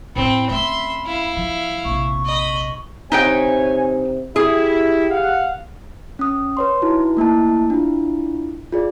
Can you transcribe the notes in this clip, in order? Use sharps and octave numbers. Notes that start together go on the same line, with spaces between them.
A2 C4 E4 B5
A3 C#4 E5 C6
E4 F5
F3
A#1 C3 C#6
D#5 B5
C3 D#4 B4 C#5 G5 G#5
E4 G4 G#4
F5 F#5
C#4 D#6
B4 C#5 C6
D#4 E4 F#4 B4
A3 A#3 E4 A5
D4 E4 F4
F4 G#4 D5